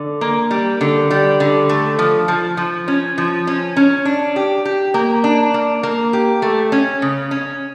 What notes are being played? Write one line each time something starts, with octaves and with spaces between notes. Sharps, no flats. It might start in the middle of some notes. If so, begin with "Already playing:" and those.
Already playing: D3
A#3
G3
D3
G3
D3
A3
F3
F3
F3
C#4
F3
C#4
C#4
D4
G4
G4
A#3
D4
A#3
A#3
G4
A3
C#4
C#3
C#4